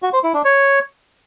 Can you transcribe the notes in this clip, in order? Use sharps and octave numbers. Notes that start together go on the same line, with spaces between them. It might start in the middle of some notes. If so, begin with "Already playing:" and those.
F#4
C5
E4
D4
C#5